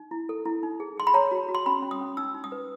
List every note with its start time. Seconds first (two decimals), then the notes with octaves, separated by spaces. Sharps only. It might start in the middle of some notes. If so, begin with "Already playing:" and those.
Already playing: D#4
0.11 E4
0.29 A4
0.45 E4
0.63 D#4
0.80 G#4
0.97 G#4 C6
1.07 B5
1.14 C#5 A#5
1.32 F#4
1.49 F#4
1.55 C6
1.66 C#4 B5
1.83 C#4
1.91 D#6
2.01 C#4
2.17 D#4 E6
2.34 D#4
2.44 D#6
2.52 B4